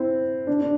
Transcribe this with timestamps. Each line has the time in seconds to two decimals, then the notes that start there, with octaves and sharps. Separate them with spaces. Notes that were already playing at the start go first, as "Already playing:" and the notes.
Already playing: C4 E4
0.47 D4
0.61 D4